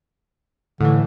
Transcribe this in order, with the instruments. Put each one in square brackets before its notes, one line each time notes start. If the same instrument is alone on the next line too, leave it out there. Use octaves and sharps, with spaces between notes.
[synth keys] A2 E3 [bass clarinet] D3